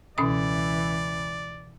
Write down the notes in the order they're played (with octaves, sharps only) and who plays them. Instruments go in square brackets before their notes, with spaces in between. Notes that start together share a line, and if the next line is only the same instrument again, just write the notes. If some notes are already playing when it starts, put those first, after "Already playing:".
[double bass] C#2 E3 [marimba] B2 C#4 D#6 [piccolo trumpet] D5